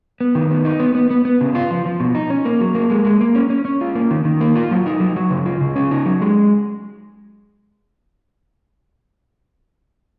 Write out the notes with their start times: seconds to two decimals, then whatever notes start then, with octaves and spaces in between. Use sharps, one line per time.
0.21 B3
0.35 D#3
0.51 B3
0.65 D#4
0.80 B3
0.95 B3
1.11 B3
1.25 B3
1.41 C#3
1.55 F4
1.71 F3
1.86 F3
2.00 B2
2.15 D#4
2.30 C#4
2.45 A#3
2.61 F#3
2.75 A#3
2.90 G#3
3.05 G#3
3.21 A#3
3.35 C#4
3.50 C#4
3.65 C#4
3.81 F4
3.95 A#3
4.11 D#3
4.25 D#3
4.41 A#3
4.55 F4
4.71 F#3
4.86 D#4
5.00 F#3
5.16 F#3
5.30 C#3
5.46 F4
5.61 C#3
5.76 C#4
5.91 D#4
6.06 F#3
6.21 G#3